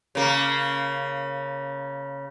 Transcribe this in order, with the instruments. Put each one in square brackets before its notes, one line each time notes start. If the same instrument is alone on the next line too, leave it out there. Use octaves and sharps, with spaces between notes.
[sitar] C#3 A#3